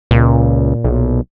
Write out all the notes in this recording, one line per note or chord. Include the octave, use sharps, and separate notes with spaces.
C#2 A#2
B1